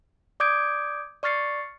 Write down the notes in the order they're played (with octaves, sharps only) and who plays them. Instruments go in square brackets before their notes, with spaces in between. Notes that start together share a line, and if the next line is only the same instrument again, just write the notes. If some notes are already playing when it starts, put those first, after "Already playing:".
[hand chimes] D5 D6 D#6 G6 G#6 D7
D5 C#6 F6 A6 C7 C#7